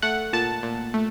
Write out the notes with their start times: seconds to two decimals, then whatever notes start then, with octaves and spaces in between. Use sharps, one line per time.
0.02 A3 F#5
0.33 A#2 A5
0.63 A#2
0.94 A3